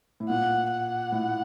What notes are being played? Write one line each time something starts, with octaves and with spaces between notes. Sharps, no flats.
A2
A#2 F#5
F#5
A2